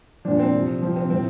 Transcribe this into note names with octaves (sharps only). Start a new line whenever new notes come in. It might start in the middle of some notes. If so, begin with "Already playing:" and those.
A#2 F3 D4
C4
C3 F3
C3 F3
C4
A2 F3 C4